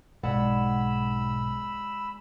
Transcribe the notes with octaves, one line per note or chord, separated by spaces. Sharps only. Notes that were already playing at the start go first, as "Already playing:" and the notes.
B1 G#2 G#3 D5 F#5 B5 E6